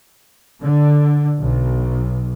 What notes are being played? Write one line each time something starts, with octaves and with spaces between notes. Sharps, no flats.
D3
B1